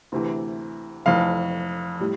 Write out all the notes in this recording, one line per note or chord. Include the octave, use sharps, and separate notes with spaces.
D2 C3 E3
F1 F2 E3 F5
A2 G3